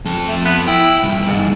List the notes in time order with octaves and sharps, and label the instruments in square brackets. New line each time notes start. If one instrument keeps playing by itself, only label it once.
[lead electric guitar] F2 A4
[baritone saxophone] A3
B3
[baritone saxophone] E4 [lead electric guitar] G5
[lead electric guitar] C#2 G2
[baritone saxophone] G#2